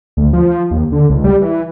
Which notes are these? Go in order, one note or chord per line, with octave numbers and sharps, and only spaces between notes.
D2
F3
D#2
D3
C#2
G3
E3